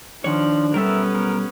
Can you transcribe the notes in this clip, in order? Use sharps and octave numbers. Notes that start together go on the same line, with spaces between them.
D#3 F3 D4 C#5
B1 G3 B3 C#4 A4 A#4 E5
A#4